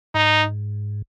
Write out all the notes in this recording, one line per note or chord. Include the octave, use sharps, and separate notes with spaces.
G#2 D#4